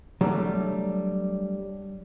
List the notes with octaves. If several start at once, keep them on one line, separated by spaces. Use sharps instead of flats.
F#3 G3 A3 D4